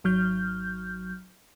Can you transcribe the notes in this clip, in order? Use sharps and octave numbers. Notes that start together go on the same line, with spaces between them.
G#1 F#3 F6 G6